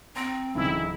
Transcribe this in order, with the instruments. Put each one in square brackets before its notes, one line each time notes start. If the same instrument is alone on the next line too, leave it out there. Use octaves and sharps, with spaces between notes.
[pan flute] C4 [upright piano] A#5 C6 A#6
[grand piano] D1 D#4 E6 [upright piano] C#3 E3 [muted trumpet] E4